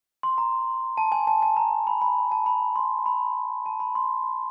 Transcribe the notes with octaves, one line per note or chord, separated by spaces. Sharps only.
C6
A#5
A5
G#5
A5
A5
A#5
B5
B5
A5
B5
C6
B5
A5
B5
C6